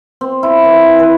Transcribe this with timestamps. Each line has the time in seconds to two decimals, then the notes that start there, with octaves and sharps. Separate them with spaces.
0.21 C4
0.43 E4
0.65 E3
0.99 B4